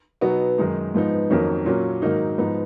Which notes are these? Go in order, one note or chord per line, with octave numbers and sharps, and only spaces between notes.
B2 F#3 B3 D#4
F#2 D#3 G#3 D#4
G#2 F3 B3 D#4
F2 D#3 F#3 A#3 C#4
A#2 F#3 A#3 C#4
G#2 D#3 F#3 A#3 D#4
G#2 F3 B3 D#4